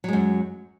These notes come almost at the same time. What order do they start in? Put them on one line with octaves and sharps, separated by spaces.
F#3 G#3 F#2